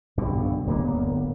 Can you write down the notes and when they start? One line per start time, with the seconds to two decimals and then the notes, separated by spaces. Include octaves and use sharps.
0.17 B1 G2 B2 D3
0.67 D1 G1 A#3 B3